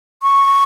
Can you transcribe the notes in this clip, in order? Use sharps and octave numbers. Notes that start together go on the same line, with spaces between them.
C#6